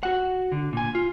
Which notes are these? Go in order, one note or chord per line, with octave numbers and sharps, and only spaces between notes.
F#4 F#5
D3
A#2 G#5
F4